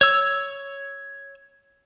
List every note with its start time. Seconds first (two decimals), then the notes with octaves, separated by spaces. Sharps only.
0.01 C#5 E6